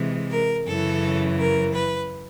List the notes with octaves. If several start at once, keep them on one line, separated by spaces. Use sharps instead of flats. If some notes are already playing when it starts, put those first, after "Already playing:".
Already playing: C3 E3 G#3
A#4
F#2 C#3 E3 A4
A#4
B4